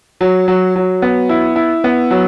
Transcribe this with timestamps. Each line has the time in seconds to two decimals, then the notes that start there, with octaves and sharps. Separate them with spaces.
0.21 F#3
0.48 F#3
0.76 F#3
1.02 B3
1.29 E4
1.56 E4
1.84 B3
2.11 F#3